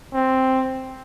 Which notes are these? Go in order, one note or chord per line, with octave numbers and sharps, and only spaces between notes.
C4